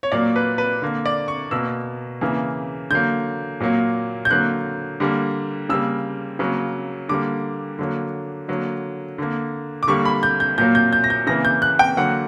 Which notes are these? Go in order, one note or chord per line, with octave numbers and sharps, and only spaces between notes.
C#5
A#2 F#3 A#3 D5
B4
B4
D3 A#3
D5
C#6
B2 A#3 E6
C#3 E3 A#3
D3 F#3 A#3 G6
A#2 F#3 A#3
G6
D3 F#3 A#3 F#6
D3 G3 A#3
C#3 G3 A#3 E6
C#3 F#3 A#3
D3 G3 A#3 D6
D3 F#3 A#3
D3 F#3 A#3
D3 A#3
D6
D3 G3 A#3 C#6
B5
G6
G6
A#2 F#3 A#3 G6
G6
G6
A#6
G6
C#3 E3 A#3 A#6
G6
F#6
G5
D3 F#3 A#3 F#5